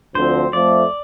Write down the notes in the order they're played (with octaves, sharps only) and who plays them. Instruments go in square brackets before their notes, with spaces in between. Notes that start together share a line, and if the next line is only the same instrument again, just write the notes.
[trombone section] D2 D3 F3 C4 [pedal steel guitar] C5
[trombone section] F2 F3 A3 [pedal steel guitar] D5